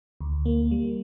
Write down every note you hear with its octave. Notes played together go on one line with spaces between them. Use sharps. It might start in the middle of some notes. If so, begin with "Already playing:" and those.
D2
A#3
G3